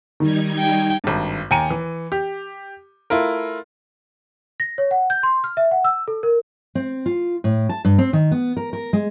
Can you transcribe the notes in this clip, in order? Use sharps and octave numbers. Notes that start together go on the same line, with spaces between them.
D#3 G3 D#4 G#6
G5
G#1 G2
D#2 G5 G#5 A#5 C#7 D#7
E3
G4
A3 E4 F4 A#4
A#6
C#5
F#5
G6
C6
F6
E5
F#5
E6
A4
A#4
C4
F4
A2
A5
G2
C4
D#3
B3
A#4
A#4
G#3